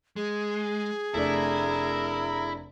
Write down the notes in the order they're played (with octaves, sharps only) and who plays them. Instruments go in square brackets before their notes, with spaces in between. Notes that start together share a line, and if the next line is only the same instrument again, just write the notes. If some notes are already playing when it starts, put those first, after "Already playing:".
[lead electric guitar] G#3 [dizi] G#4
[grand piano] F1 A3 D4 [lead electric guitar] E4 [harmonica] A#4 A#5